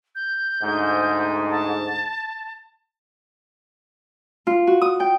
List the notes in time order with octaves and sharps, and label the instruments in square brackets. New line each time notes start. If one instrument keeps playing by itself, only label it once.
[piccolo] G6
[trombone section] D2 G#2
[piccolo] A5
[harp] F4
F#4
D#6
G5